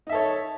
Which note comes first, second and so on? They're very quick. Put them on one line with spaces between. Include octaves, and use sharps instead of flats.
D#4 E5 A4 C#5